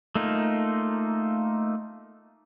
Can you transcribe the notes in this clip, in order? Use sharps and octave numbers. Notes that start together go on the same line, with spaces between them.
A3 A#3 D#4 F4